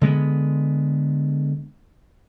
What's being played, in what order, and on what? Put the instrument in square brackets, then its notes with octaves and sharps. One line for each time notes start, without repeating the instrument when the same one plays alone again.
[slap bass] D3 G#3 B3